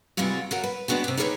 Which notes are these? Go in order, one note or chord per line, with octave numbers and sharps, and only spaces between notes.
C3 E3 G3 G#3 F4 F#4
F#3 F#4 A#4
B4
G#3 B3 D4 F#4 G4
C3 G4
D#4 G4 G#4 A#4 B4 C#5